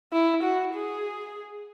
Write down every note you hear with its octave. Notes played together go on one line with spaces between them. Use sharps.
E4
F#4
G#4